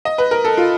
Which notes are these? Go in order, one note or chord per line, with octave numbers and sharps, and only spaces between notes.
D#5
B4
A#4
A4
F4